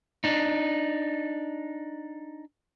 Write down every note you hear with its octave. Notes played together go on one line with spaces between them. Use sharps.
D4 D#4